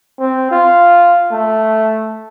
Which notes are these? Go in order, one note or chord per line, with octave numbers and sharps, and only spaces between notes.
C4
F4
A3